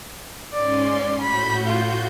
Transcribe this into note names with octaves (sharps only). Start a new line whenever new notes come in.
G#2 C#4 D5 C6
A2 F#4 B5 G6
F4